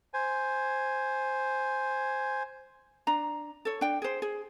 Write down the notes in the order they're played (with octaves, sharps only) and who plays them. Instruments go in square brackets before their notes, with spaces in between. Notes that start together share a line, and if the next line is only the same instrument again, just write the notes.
[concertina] C5 G#5
[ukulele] D4 A#5
A4 C#5
D4 G5
G#4 C5
G#4